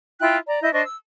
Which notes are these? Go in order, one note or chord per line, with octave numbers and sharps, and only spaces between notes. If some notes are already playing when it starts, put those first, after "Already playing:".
E4 F4 G5 F#6
D5 A#5
E4 D#5 G6
D4 C5 D#5 C#6
E6